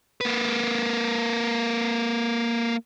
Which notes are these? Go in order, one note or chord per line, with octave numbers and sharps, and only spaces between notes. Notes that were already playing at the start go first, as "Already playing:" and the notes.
A#3 B4